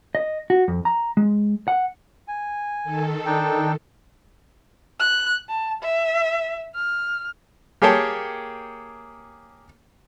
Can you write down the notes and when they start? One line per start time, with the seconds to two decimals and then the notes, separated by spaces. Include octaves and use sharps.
0.15 D#5
0.50 F#4
0.68 F2
0.85 A#5
1.17 G#3
1.68 F#5
2.28 G#5
2.84 D#3 A4
3.26 D4 D#4 G5
5.00 F#6
5.49 A5
5.83 E5
6.75 F6
7.82 A#3 G4 G#4 C#5 G5 A5